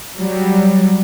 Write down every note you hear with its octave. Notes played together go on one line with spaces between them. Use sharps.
F#3 G3